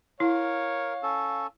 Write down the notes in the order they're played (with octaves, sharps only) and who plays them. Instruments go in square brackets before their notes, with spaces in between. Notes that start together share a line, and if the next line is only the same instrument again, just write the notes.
[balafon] E4 [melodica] A#4 [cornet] C#5 [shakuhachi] F5
[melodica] C#4 A4